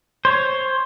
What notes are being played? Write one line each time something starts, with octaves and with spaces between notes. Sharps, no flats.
C5 C#5